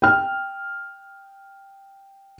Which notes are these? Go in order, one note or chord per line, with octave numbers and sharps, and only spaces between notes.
G5 F6